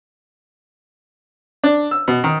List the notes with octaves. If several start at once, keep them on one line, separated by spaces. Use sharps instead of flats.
D4
E6
B2
D#3